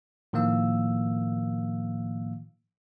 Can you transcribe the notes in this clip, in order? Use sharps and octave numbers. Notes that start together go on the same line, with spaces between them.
A2 D#3 F3 A#3 F5 E6